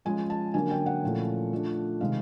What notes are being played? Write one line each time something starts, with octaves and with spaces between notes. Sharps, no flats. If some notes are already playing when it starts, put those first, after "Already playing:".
F3 G#3 C#4 G#5
A5
D3 F#3 A#3 C#4 G#5
G5
F#5
A#2 F3 A3 C#4 E4
F3 A3 D4
C3 D#3 G#3 C4 F5